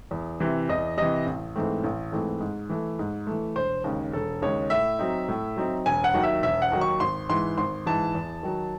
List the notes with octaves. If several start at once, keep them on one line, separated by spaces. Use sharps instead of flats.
E2
C3 E3
E2 D#5
C3 E3 D#5
A1
G#2 E3 A3 C4
A1
G#2 E3 A3 C4
G#2
E3 A3
G#2
E3 A3
E1 C5
D#2 C#3 G#3
E1 A4
D#2 C#3 G#3 C#5
A2 E5
F#3 C4 D#4
A2
F#3 C4 D#4
E1 G#5
F#5
D#2 D#3 F#3
E5
E1 E5
F#5
D#2 D#3 F#3
C#6
G#1 C6
G#2 E3 C6
G#1 C6
G#2 E3 A5
E2
D#3 F#3